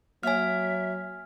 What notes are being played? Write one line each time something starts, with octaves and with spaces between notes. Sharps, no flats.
F#3 A#3 C#5 E5 G#5 F6